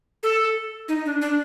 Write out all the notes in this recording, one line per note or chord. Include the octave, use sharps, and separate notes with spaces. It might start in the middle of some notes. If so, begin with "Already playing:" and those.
A4
D#4
D4
D4